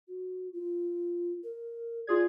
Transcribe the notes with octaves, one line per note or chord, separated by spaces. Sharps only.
F#4
F4
A#4
F4 G#4 D5 G#6